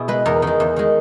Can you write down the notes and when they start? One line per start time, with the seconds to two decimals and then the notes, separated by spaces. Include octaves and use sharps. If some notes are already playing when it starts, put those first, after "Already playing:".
Already playing: B2 E4 G#4
0.08 G#3 B4
0.26 E2 A#4
0.42 D#3 G#3
0.60 E2
0.76 D#3 G#3